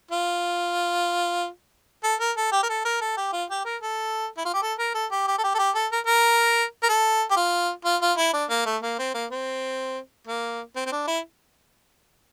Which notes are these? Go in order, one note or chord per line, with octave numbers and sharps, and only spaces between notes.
F4
A4
A#4
A4
G4
A#4
A4
A#4
A4
G4
F4
G4
A#4
A4
E4
F4
G4
A4
A#4
A4
G4
G4
A4
G4
A4
G4
A4
A#4
A#4
A#4
A4
G4
F4
F4
F4
E4
D4
A#3
A3
A#3
C4
A#3
C4
A#3
C4
C4
D4
E4